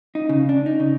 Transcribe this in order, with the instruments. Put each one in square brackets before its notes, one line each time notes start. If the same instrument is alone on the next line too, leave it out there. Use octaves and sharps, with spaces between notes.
[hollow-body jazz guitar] D#4
C#3
D4
D#4
C#3